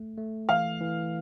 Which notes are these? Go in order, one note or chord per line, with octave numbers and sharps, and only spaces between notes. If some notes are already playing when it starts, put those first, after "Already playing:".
Already playing: A3
A3
E3 F5
E3